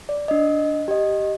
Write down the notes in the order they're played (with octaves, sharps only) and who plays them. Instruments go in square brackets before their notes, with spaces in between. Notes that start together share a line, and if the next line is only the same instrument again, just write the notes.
[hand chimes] D5
D4 D#5
G4 D#5